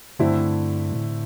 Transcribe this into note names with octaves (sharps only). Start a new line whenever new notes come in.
G2 D3 A3 C4 E4
A2